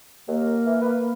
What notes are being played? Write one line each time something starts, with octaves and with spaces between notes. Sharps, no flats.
D#2 A#3
E3
B4